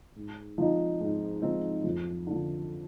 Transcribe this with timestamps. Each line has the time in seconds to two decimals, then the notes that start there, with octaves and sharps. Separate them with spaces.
0.16 G#2
0.58 F3 C4 D#4
1.00 G#2
1.42 F3 C4 D#4
1.84 F2
2.27 D3 F3